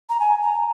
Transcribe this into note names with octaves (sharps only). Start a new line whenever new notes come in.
A#5
G#5
A#5